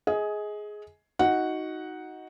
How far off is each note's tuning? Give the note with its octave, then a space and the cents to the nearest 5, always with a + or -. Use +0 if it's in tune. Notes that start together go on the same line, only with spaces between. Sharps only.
G#4 +10 D#5 +30
D#4 +15 F#4 +0 F#5 +0